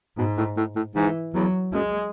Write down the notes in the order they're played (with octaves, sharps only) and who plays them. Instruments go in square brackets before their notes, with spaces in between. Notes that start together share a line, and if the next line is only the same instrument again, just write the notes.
[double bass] G#2 [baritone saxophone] B2
[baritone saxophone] A2
A2
A2
[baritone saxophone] G#2 [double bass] E3
[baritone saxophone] E2 [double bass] F#3
[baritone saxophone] F#2 [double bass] G#3